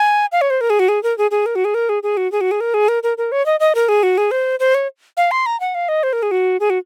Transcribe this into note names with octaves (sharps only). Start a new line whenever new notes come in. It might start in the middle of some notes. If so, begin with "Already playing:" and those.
Already playing: G#5
F5
C#5
C5
A#4
G#4
F#4
G#4
A#4
G#4
G#4
A#4
F#4
G#4
A#4
G#4
G#4
F#4
G#4
F#4
G#4
A#4
G#4
A#4
A#4
A#4
C#5
D#5
D#5
A#4
G#4
F#4
G#4
C5
C5
C#5
F5
C6
A#5
F#5
F5
D#5
C5
A#4
G#4
F#4
G#4
F#4